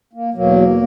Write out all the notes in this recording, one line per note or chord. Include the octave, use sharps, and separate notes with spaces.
A#3
E2 B2 F#3 A#3